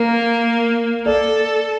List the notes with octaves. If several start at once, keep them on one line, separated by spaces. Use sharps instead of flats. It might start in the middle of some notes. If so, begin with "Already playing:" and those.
Already playing: A#3 A#4
A4 D5